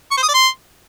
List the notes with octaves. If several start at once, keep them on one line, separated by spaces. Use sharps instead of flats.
C#6
C5
D#6
D5
C6